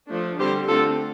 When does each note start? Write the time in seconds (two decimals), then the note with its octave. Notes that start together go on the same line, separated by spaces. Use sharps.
0.10 F3 A3 D4
0.39 D3 G3 C4 G4 C5
0.69 D3 A3 C4 F4 A4